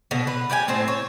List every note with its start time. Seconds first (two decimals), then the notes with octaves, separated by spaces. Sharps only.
0.11 B2 D3
0.27 B4
0.50 G4 D5 F#5 G#5
0.68 A2 C4 C5 A5
0.88 C#5